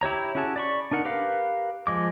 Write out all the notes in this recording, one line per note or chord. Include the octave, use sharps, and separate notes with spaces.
E4 G4 C#5 A#5
C#4 E4 F#4 G#4 A5
D5 B5 C#6
D4 D#4 A#4 F#5
G4 A#4 B4 F5
F3 G#3 D6